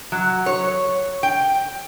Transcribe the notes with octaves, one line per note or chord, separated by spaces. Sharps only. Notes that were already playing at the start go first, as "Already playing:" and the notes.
F#3
C#5
G5